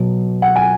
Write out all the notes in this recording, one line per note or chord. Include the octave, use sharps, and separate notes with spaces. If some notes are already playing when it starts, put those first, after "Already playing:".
Already playing: B2 F#3
F#5
G#5